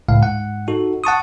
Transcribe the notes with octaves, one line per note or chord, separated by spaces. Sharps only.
C#2 A2 F5
G#2 F#5
D#4 F#4 A4
F#5 A5 C#6 D#6